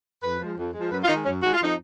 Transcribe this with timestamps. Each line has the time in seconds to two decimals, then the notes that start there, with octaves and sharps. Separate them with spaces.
0.22 F2 B4
0.39 F3 G#3
0.56 F2
0.74 F3 G#3
0.91 F#2 B4
1.03 F4
1.07 D#3 D#4
1.10 G#3
1.25 F#2 C#4
1.41 D#3 G#3 F#4
1.52 F4
1.59 F2 D#4